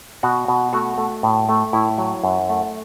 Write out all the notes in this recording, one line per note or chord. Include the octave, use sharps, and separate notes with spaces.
B2 F#4
B2
A3 F#4
A3
A2
A3
A2 E4
F#3
F#2
A3